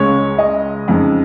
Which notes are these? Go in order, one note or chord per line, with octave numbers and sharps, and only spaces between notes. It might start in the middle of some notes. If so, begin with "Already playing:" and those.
Already playing: C#2 C#3 G#3 C#4 C#5
D#5
F2 C#3 F3 G#3 D#4